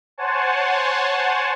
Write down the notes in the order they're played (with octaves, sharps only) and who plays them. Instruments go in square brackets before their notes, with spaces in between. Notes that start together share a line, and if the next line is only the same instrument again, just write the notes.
[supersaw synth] C5 C#5 F#5 G#5 A5